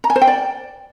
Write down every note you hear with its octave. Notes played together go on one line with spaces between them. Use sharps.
A#5
G#5
C5
G5
D5